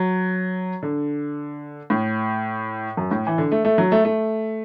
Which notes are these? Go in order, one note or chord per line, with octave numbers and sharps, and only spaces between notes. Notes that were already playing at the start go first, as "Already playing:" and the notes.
Already playing: F#3
D3
A2
F#2
A2
E3
D3
A3
A3
F#3
A3
A3